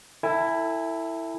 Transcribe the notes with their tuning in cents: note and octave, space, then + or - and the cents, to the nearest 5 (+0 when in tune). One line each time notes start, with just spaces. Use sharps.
E4 +0 A4 +30 G#5 -30